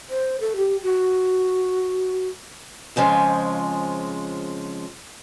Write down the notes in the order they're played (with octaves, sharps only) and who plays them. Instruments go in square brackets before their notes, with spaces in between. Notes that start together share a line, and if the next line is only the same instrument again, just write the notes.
[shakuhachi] C5
A4
G4
F#4
[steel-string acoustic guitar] F2 C#3 F3 G#3